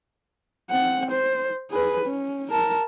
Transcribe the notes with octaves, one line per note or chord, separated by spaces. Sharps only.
C4 F#5
C5
G#4 B4
C#4
A#4 A5